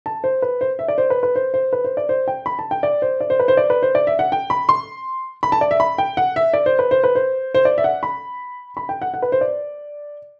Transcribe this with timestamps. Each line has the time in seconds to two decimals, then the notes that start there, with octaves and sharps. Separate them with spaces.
0.06 A5
0.24 C5
0.42 B4
0.61 C5
0.79 E5
0.88 D5
0.98 C5
1.10 B4
1.23 B4
1.36 C5
1.54 C5
1.73 B4
1.85 C5
1.97 D5
2.09 C5
2.28 G5
2.46 B5
2.59 A5
2.71 G5
2.83 D5
3.02 C5
3.21 D5
3.30 C5
3.40 B4
3.48 C5
3.57 D5
3.70 B4
3.83 C5
3.95 D5
4.07 E5
4.19 F#5
4.32 G5
4.50 B5
4.69 C6
5.43 B5
5.52 A5
5.61 D5
5.71 E5
5.80 B5
5.98 G5
6.17 F#5
6.36 E5
6.54 D5
6.66 C5
6.79 B4
6.91 C5
7.04 B4
7.15 C5
7.54 C5
7.65 D5
7.78 E5
7.84 F#5
8.03 B5
8.77 B5
8.89 G5
9.02 F#5
9.14 F#5
9.22 B4
9.32 C5
9.41 D5